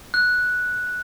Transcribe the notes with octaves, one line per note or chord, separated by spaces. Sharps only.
F#6